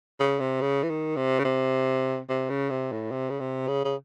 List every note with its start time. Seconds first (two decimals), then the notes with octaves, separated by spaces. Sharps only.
0.20 C#3
0.40 C3
0.61 C#3
0.83 E3
0.90 D#3
1.17 C3
1.39 C#3
1.45 C3
2.29 C3
2.50 C#3
2.70 C3
2.92 A2
3.12 C3
3.30 C#3
3.40 C3
3.68 C#3
3.85 C#3